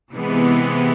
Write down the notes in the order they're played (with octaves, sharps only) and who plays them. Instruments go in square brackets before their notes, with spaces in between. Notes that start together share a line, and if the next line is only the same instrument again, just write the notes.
[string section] C3 E3 G#3 B3